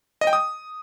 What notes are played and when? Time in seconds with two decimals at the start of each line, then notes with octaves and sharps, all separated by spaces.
0.21 D#5
0.27 G5
0.33 D#6